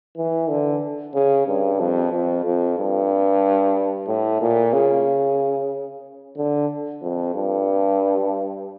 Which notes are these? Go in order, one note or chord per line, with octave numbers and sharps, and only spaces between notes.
E3
D3
C#3
G2
F2
F2
F2
G2
A2
A#2
C#3
D3
F2
G2